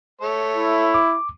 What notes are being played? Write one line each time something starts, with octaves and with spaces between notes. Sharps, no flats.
A3 A4 C#5
E4
D6